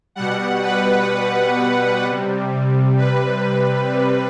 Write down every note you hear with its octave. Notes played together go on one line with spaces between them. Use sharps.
B2 G3 F#5
B4
C3 G3
B4
C3 G3